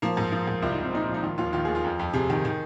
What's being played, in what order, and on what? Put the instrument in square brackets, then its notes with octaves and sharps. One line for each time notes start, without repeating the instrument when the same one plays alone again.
[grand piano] F3 A#3
G#2
F3
G#2
C2 F4
D#4
C2
C4
A#2 D#4
F3
D#4
D#3 F4
D#2 F4
D#3 F4
D#2 G#4
F4
F2
F2
C3 G#4
D#3
D#3